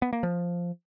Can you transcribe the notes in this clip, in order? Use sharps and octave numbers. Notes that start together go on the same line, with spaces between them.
B3
A#3
F3